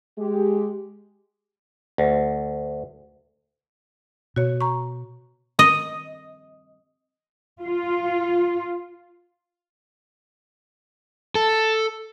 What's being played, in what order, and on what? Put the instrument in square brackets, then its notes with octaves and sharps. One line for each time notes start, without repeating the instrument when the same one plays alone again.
[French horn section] G#3 G4
[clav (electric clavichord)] D2
[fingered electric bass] B2 [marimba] F#4 C#5
[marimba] A#5 C#6
[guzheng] D#5
[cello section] F4
[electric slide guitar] A4